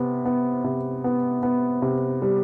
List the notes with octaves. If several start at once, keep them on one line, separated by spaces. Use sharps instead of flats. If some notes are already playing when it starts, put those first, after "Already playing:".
Already playing: C3 B3
B3
C3
B3
B3
C3
G3